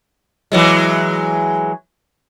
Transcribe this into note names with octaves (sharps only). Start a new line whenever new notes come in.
E3 F#3 G#3